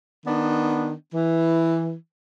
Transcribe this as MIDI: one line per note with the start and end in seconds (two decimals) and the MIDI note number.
0.25 0.92 51
0.25 0.92 59
0.25 0.92 62
1.13 1.93 52